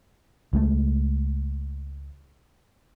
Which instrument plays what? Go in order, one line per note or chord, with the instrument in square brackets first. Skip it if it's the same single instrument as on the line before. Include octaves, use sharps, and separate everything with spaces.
[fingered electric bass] C#2 G#3 A3